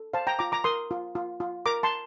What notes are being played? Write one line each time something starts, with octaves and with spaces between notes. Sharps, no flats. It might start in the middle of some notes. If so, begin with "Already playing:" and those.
Already playing: A4
C5 F5 A5
G5 A#5
F4 A#5 D6
A#5 D6
A#4 C6 D#6
F4
F4
F4
A#4 A#5 D6
A5 C6